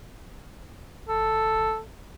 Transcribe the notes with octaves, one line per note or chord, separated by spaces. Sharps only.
G1 A4